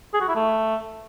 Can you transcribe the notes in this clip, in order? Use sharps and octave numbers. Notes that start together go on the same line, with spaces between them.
G#4
F#4
E4
A3